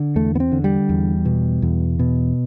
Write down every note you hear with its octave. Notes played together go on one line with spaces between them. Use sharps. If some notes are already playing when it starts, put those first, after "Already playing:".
Already playing: D3
E2 A3
B3
C4
D3
G3
E2
B2
E2
B2